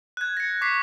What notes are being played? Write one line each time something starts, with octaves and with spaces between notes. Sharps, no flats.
F#6 G#6
A#6 C#7
C#6 D6 B6 C7